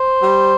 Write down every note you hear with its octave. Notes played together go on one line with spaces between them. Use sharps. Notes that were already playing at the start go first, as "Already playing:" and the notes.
Already playing: C5
G3